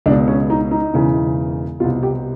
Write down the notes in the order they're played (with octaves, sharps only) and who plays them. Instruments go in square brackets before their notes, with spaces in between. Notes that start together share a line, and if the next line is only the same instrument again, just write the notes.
[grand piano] C#2 D4
B2
C#4
D#4
D#4
E1 E2 C#3 E3
C2 B2 F4
G4